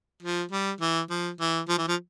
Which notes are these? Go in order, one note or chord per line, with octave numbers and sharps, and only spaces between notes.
F3
G3
E3
F3
E3
F3
E3
F3